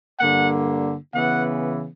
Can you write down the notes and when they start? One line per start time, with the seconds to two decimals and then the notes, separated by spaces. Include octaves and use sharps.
0.20 G2 D3 A#3 F#5
1.14 C#3 E3 B3 F#5